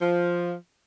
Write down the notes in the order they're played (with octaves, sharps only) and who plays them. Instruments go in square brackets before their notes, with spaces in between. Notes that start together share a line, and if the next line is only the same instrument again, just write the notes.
[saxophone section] F3